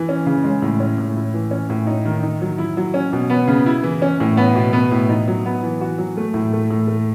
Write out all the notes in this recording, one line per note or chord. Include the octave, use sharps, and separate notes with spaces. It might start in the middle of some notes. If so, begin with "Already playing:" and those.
Already playing: E3
C#4
C#3
G#3
A2
C#4
A2
E4
E3
C#4
A2
D#4
D#3
D#4
F#3
E4
F#3
C#4
B2
B3
C#3
E4
E3
C#4
A2
B3
B2
B3
A2
D#4
F#3
B3
E3
F#4
F#3
A3
A2
A3
A2
A3